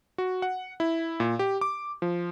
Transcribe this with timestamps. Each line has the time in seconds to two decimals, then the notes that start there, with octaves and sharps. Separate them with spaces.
0.18 F#4
0.42 F#5
0.80 E4
1.20 A#2
1.39 G4
1.61 D6
2.02 F3